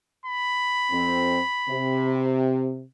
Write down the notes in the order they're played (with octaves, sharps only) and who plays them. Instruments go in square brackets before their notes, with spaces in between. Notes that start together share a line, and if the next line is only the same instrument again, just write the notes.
[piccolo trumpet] B5
[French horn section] F2 C4
C3